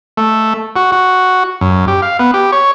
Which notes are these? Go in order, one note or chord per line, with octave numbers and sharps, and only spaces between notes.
A3
F#4
F#4
F#2
G4
F5
B3
G4
C#5